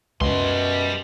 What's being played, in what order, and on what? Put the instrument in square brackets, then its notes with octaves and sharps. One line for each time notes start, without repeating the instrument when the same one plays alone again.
[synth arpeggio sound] C#2 [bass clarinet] F#2 [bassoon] B2 [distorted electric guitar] G3 C6